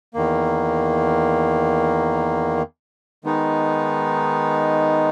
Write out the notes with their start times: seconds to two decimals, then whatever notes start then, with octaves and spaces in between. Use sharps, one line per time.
0.14 E2 D#3 A#3
3.24 D#3 G#3 B3 D#4